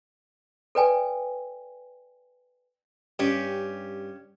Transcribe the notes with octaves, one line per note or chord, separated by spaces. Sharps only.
A4 B4 D5 G5 G#5
G2 C#4 G4